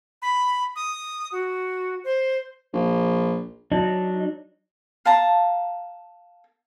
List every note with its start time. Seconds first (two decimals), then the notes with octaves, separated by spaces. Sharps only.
0.22 B5
0.76 D#6
1.32 F#4
2.04 C5
2.73 A#1
3.72 F#3 D4 D#4
5.05 F5 A5 A#5